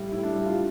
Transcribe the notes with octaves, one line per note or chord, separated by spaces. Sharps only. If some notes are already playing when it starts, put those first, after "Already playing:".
Already playing: A2 G3
A2 E4
D4
G3
F4